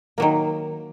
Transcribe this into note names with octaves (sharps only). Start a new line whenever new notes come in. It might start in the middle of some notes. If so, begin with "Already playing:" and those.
D#3 F#3 A#3